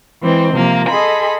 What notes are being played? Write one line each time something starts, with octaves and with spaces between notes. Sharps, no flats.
E3 G#3 C4
C3 F3 A#3
G#4 A4 D#5 B5 C6